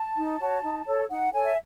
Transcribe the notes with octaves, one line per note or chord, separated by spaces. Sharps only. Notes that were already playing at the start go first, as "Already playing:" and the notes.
Already playing: A5
D#4
F#4 C#5
D#4
A4 C#5
D#4 F#5
A4 C#5 G#5
E5